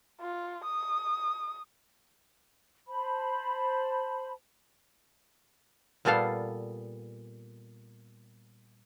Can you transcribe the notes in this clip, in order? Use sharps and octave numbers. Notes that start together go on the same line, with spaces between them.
F4
D#6
C5 A5 B5
A#2 G3 B3 A4 F5